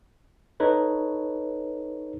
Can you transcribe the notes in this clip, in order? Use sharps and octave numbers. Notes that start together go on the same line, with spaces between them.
D#4 A4 B4 C#5